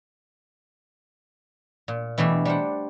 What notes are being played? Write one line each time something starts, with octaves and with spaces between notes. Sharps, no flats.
A#2
B2 E3 G3 A3 D4
G3 D4 C5 F#5